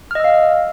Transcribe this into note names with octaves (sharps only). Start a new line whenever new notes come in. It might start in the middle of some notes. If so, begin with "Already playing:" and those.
D#5 F5 E6 F6